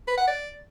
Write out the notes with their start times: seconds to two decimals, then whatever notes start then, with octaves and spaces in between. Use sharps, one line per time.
0.08 B4
0.17 F#5
0.27 D5